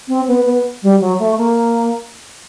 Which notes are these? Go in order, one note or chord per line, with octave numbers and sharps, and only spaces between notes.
C4
B3
B3
G3
F#3
A3
A#3